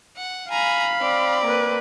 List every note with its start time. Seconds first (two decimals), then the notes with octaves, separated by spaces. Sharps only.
0.17 F#5
0.50 F5 G#5 A#5 B5
1.01 C4 D5
1.44 A#3 B4